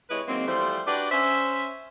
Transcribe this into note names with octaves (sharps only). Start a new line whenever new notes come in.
C3 G#3 E4 B4 C#5 D#5
D#3 F#3 G#3 A#3 C4
E3 F3 G3 A3 C5
D4 F#4 G4 B4 D5
C#4 C5 E5